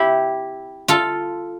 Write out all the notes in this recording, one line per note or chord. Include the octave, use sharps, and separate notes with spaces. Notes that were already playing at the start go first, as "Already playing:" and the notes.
Already playing: E4 G4
F4 A4